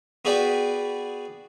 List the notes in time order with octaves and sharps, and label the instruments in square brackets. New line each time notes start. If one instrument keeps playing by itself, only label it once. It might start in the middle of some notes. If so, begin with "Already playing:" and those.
[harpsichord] B3 F#4 G#4 B4 D5 G5